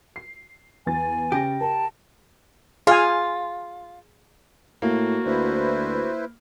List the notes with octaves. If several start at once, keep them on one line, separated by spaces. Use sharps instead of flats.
C7
E2 G#5 A6
C#3 G4 A#6
A#4 A5
F4 G#4 F5 G#5
A2 A#3 F#4
D2 E4 B4 C5